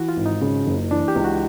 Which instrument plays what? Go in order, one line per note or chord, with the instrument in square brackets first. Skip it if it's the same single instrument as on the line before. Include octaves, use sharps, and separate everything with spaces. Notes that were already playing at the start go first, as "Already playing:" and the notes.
Already playing: [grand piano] E3 [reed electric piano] F#4
[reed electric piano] F4
[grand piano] G#1
[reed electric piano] D#4
[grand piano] C#3
F#1
[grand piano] E3 [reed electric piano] D4
[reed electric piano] G4
[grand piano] C#2
[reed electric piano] F#4